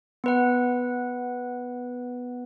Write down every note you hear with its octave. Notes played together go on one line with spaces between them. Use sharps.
B3 B4 F#5